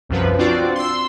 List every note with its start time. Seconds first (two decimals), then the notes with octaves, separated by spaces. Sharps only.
0.09 C2 F#2 F3 B4
0.38 C4 D4 F4 F#4 D5
0.75 C6 E6